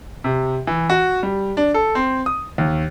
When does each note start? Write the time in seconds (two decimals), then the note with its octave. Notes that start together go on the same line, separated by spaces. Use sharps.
0.24 C3
0.67 E3
0.90 F#4
1.23 G3
1.57 D4
1.74 A4
1.95 C4
2.26 D#6
2.58 D#2